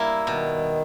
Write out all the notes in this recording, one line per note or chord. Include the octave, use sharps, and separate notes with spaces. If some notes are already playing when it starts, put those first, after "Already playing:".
Already playing: G3 A#3 E4
B2 D#3